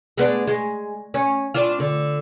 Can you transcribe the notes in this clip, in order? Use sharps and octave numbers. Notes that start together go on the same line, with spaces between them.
G#3 B3 D4
G#3
C#4
C4 D4 F4
D3